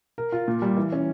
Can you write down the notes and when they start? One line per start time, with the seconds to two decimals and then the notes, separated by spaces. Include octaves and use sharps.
0.18 A#4
0.32 F4
0.48 A#2
0.62 G3
0.77 E3
0.92 C#4